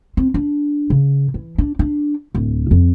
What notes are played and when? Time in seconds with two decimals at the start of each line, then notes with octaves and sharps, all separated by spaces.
0.17 C4
0.34 D4
0.90 C#3
1.34 E3
1.58 D4
1.79 D4
2.35 D1
2.71 F2